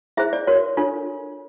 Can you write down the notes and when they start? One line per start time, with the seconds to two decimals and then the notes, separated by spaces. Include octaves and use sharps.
0.17 E4 G#4 C5 E5
0.33 D5
0.47 F#4 A#4 C#5
0.77 D4 F4 A4 C#5